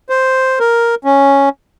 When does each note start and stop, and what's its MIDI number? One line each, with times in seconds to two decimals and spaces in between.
0.09 0.59 72
0.60 0.95 70
1.05 1.49 61